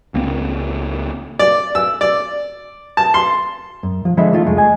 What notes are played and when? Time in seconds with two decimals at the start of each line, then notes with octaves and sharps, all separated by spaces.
0.14 C#2 A#3 C4
1.39 D5
1.75 E6
2.01 D5
2.97 A5
3.14 C6
3.83 F#2
4.05 F3
4.17 D3 F3 G#3 D#5 E5 B5
4.32 E3 A3 D#4 F4
4.45 C2 F2 G#3 A3
4.57 D#5 G#5